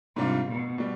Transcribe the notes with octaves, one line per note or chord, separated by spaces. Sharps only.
G#2 C3 G3 D4 F4
B2
B2 G3